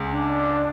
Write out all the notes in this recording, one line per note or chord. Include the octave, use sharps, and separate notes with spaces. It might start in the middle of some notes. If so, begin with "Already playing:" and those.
Already playing: C#2 C#3 G#3
D4